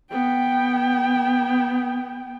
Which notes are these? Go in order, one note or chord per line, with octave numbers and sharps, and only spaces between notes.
B3 G5